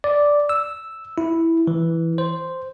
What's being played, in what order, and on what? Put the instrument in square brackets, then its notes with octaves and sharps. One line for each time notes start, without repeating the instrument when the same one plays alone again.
[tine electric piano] D5
E6
E4
E3
C5